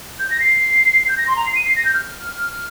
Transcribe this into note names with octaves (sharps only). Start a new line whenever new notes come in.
G6
A#6
C7
G6
A#6
C6
A#5
C7
D#7
C7
A#6
G6
F6